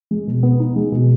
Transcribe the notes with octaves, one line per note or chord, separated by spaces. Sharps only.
G#3
B2
B3
D#4
G#3
B2